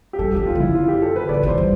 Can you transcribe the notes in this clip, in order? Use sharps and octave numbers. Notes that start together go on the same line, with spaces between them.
G4
G3 A4
F3 G4
F4
D3 E4
F4
G4
A4
B4
D3 D5
E3 C5
G3